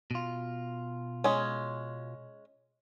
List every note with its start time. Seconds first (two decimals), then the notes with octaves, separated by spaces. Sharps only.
0.11 B2 F4
1.24 G#3 C#4